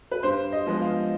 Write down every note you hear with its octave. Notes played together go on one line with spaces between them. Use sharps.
B4
G2 C5
D#5
F3 G#3 B3
F5